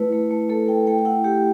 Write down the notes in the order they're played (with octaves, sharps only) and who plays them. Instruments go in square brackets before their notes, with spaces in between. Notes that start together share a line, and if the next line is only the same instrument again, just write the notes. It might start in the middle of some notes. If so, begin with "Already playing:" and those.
Already playing: [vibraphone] A3 E4 B4
A3
A3
A3 A4
A3 G5
A3 G5
G5
E4 F#5
A3 G4